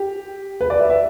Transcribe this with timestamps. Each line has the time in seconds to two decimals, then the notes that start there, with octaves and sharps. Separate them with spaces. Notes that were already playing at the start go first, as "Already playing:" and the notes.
Already playing: G4
0.61 B4
0.70 D5
0.79 E5
0.90 E5